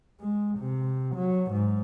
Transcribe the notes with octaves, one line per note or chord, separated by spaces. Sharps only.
G#3
C3
F#3
G#2